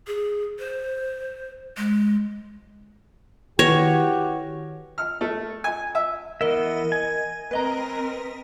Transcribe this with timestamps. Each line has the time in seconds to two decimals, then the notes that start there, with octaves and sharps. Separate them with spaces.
0.07 G#4
0.59 C5
1.77 G#3
3.59 D#3 E4 F#4 G4 B4 C#5 A#6
4.98 F6
5.21 A3
5.64 G#5
5.95 E5
6.41 E3 B3 A#4 D#5 E5
6.92 G#5
7.51 C4 A#4 B4 D#5 A#5